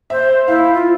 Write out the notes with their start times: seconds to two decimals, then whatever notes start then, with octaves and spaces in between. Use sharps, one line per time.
0.10 C5 E5
0.48 E4 F5
0.74 F4